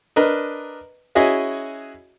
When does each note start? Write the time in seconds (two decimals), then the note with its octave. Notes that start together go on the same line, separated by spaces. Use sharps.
0.16 D4 A#4 B4 D#5
1.15 C#4 E4 F#4 G#4 D#5 E5